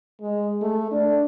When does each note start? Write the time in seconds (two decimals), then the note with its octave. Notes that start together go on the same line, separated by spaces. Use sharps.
0.21 G#3
0.62 A3
0.91 D4